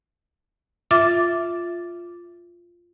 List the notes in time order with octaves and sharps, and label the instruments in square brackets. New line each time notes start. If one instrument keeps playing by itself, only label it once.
[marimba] F4 E5 D6 A6